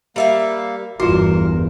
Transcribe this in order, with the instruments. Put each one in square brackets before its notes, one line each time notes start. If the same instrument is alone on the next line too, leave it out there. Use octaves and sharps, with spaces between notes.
[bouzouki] G3 E5 F5 [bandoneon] A#3
[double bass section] G1 E2 G2 [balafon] F4 F#4 [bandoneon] A#4 [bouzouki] C5